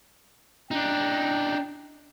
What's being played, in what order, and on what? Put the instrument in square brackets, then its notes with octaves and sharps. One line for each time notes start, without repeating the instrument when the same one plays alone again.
[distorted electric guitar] D4 D#4 [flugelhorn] G5